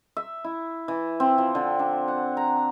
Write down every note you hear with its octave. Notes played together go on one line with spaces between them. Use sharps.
E5
E4
E3
C4
F3
D3
D4
F#5
A#5